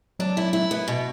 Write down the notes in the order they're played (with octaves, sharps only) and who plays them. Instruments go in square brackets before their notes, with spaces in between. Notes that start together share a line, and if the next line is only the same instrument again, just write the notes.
[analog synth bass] F#3 [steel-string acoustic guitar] D4
[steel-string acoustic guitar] E4
E4
B3
B2